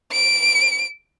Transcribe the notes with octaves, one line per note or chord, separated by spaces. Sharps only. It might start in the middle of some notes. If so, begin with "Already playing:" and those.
D7